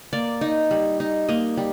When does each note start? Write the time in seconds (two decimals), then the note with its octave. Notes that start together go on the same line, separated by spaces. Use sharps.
0.13 A#3 D5
0.41 D#4
0.71 G3
1.00 D#4
1.28 A#3 D#5
1.57 G3